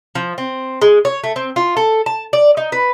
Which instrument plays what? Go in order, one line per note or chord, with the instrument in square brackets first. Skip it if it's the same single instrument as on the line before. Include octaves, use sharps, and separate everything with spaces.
[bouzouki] F3
C4
G#3
C#5
A3
C4
F4
A4
A5
D5
D#4
B4